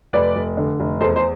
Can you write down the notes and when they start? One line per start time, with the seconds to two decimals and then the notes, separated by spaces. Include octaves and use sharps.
0.13 F1 B4 D5
0.36 F1
0.57 D3
0.80 F1
1.00 E2 A4 C5
1.16 C5